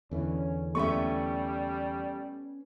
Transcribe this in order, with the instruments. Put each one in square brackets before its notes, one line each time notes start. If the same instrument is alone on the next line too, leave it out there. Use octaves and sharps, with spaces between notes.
[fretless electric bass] E2 D3 E3 [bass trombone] C#4
[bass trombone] G3 [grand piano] A3 C#6 [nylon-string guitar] B3 C#4 E5